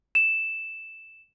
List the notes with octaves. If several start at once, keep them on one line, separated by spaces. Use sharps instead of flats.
E7